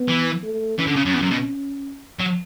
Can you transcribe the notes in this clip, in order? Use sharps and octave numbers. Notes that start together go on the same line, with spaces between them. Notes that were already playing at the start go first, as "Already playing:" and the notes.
Already playing: B3
E3
A3
E3 C#4
D3
C#3
F#2
E2
F#2
B2
F#3